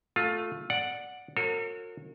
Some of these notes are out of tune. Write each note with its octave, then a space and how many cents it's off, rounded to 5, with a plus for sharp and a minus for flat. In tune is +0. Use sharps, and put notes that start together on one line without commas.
A3 +0 F4 +15
D5 +0 F#5 -10
F#4 -35 A#4 -40 C#5 -30